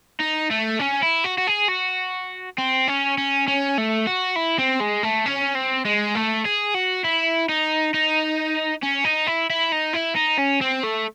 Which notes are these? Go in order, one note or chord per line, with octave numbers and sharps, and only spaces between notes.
D#4
A3
C#4
E4
F#4
F#4
G#4
F#4
C4
C#4
C#4
C#4
A3
F#4
E4
C4
G#3
A3
C#4
C4
G#3
A3
G#4
F#4
E4
D#4
D#4
C#4
D#4
E4
E4
D#4
E4
D#4
C#4
C4
A3